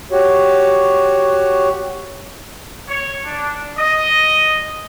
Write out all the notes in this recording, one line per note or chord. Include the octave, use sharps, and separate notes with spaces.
F#4 G4 C#5
C#5
D4
D#5